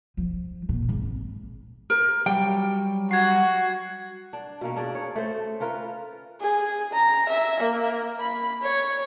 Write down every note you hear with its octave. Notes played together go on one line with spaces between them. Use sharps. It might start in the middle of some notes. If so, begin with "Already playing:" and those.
F3
A#2
G#1
A#4
F#3 G3 G5
F#4 G#6 C7
D4
B2 A#3 C#4
C#4 D4 G#4 D5
C#5
A3 C5
C#4 F4 A#4 B4
G#4
A#5
E5
A#3
B5
C#5